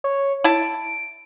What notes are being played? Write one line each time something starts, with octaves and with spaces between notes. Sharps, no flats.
C#5
E4 A5 D7